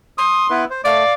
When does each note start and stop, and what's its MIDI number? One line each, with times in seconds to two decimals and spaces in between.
0.18 0.62 84
0.18 0.47 87
0.50 0.65 59
0.50 0.65 64
0.50 0.65 71
0.70 0.81 72
0.85 1.04 57
0.85 1.14 74
0.85 1.13 77